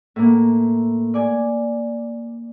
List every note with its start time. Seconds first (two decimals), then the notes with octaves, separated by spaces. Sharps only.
0.16 A2 A#3
1.14 D5 G#5